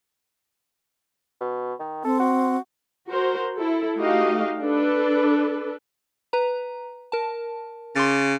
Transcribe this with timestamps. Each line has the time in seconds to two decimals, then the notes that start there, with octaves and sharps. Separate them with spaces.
1.40 B2
1.80 D#3
2.04 C4 A4
2.19 F#4
3.07 F#4 A#4 C5
3.56 E4 A4
3.98 A3 D#4 F#4 G4 D#5 F5
4.60 D4 A4 B4
6.33 B4 A#5
7.12 A#4 A5
7.95 C#3 C6 D6 A6